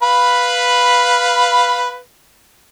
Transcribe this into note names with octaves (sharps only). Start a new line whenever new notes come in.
B4 F5 B5